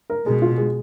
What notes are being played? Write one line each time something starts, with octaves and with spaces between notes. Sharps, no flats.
A#4
B2 G#3
F4
G#3